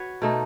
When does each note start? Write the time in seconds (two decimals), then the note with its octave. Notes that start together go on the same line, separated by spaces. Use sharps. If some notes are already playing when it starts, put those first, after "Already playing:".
Already playing: F#4 B4 C#5
0.22 B2 A3 D#4